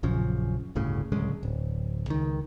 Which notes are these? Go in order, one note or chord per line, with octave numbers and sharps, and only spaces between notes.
A#1 F#2 C#3 F3
G1 D2 A2 C#3
D1 C2 C#3 G#3
D1
C#2 D#3